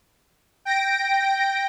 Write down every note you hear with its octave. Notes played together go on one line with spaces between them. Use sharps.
G5 A#6 D7